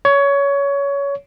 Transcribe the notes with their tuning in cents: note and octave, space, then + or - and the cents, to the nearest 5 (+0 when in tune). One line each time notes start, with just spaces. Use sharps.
C#5 +20